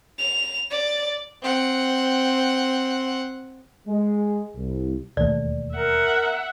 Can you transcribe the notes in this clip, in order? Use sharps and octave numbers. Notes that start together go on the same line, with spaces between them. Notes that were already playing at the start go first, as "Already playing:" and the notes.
F7
D5
C4 F#5
G#3
C2
E1 D#2 A3 D5
A#4 E5 F#5